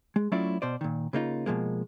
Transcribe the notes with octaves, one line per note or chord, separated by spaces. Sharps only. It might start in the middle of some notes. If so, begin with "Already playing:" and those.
G#3
F#3 A3 C#4 E4 F4 D5
B2 C5 D5
A#2 D#3
C#3 A#3 D#4 F4
B2 F3 G#3 A#3